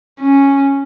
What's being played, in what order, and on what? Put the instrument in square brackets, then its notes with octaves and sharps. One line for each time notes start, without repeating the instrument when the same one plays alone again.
[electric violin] C#4